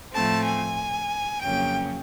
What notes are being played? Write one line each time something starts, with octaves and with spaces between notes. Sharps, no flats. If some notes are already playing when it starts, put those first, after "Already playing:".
A2 F3 A3 C4 A5
G#5
F2 C#3 F#3 A#3 C#4 G5